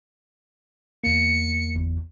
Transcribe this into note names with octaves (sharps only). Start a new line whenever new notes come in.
E2 A#3 C#7
G1 E2